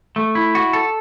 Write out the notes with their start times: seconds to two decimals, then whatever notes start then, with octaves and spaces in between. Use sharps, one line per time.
0.16 A3
0.35 E4
0.55 F#4
0.73 A4